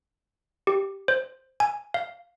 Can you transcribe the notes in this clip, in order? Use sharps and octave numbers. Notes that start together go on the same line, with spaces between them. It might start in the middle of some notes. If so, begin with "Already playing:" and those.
G4
C5
G#5
F5